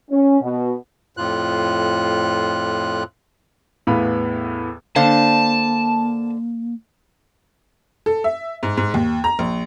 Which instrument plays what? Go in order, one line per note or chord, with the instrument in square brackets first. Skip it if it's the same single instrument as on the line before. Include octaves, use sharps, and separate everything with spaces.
[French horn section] C#4
B2
[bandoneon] F2 A2 F4 F#6
[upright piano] E2 A2 B3 F5 B5
[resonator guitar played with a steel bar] D3 C5 F5 [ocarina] A#3 [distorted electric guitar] A5
[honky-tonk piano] A4
E5
G#2
G#2
D#2
A#5
A#1